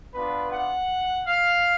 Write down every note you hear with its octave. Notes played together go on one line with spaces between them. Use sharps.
B3 D4 F4 B4
F#5
F5